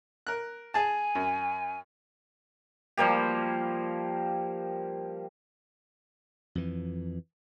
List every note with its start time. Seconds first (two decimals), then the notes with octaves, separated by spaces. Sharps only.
0.27 A#4 F#6
0.74 G#4 G#5 A5
1.15 F#2
2.97 F3 G3 A#3 G4
6.55 F2 E3